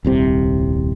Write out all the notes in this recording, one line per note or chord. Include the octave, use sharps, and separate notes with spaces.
D#1 C2 C3